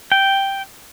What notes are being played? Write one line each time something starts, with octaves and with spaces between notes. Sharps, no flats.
G5